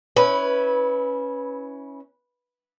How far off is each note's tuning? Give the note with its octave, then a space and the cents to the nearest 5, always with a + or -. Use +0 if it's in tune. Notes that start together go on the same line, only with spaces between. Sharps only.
C#4 +0 E4 -25 B4 +0